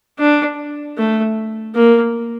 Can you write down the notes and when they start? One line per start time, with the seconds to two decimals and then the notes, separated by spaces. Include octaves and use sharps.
0.19 D4
0.97 A3
1.75 A#3